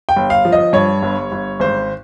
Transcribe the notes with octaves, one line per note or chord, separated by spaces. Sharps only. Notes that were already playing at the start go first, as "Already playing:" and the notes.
G5
G1
F5
F3
D#5
G2 C#5
G1
G1
G#1 C5